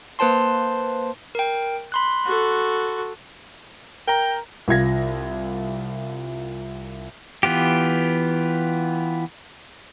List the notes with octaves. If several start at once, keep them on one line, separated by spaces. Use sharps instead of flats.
A#3 B4 C5 A5 C6
A#4 G5
B5 C6 F#6
F#4 A4
A#4 G5 A#5
C2 F4 G#6 A#6
E3 B3 F4 G4